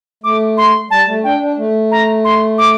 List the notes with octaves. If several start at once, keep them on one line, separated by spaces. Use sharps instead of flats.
A3 D6
C6
G3 A5
A3
D4 G5
D4
A3
A#5
C6
D6